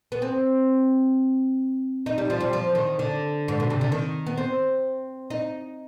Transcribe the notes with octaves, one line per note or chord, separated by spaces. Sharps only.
B3
C4
D#4
G3
F3
G3
F3
D#3
D3
G#2
B2
C3
D3
D#3
B3
C4
D#4